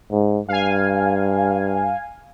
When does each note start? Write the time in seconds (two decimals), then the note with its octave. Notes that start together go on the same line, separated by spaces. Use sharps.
0.12 G#2
0.48 G2 F5 G#5